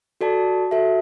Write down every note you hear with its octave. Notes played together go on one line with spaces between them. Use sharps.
F#4 A4 D5 A5
F#4 A4 E5